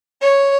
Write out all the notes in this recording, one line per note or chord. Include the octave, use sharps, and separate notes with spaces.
C#5